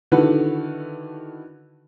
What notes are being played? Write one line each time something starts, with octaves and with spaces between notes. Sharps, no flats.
D3 D#3 E4 F#4 A4 B4